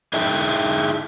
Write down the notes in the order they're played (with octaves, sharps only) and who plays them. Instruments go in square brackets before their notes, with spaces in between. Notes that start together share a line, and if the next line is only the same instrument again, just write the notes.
[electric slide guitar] D#4 E4 G#4 E5 G5